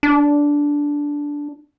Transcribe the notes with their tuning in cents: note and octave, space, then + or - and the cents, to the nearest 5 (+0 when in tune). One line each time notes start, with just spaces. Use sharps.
D4 -10